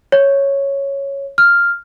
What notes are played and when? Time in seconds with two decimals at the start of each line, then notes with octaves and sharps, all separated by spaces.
0.12 C#5
1.38 F6